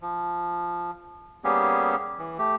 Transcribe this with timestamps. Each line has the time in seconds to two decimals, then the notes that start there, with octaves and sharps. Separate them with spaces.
0.01 F3
1.44 G3 A#3 B3 C#4 G4 G#4
2.19 E3
2.39 A3 G4